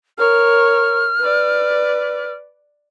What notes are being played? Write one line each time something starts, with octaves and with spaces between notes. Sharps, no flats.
A#4 C#5 F6
B4 D5